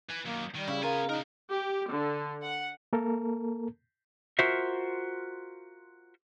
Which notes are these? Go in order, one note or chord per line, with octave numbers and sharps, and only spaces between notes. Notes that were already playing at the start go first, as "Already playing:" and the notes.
B4 G#5
F#2 D#3 A#3
D#3 G3
C#3 E4
B3 F4 A#4 G#5
D4 D#4 A#4
G4
D3
F#5
A#3 A4 A#4
F4 F#4 A#4 C5 E5